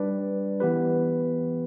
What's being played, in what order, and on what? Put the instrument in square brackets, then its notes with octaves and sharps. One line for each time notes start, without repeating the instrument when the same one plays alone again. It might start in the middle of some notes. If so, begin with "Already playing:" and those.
Already playing: [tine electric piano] G3 D4 B4 D5
E3 B3 G4 B4